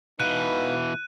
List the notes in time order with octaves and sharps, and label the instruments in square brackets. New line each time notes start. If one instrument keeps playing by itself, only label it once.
[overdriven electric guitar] B2 E3 [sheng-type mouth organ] D#4 B4 F5 [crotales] F#6 D#7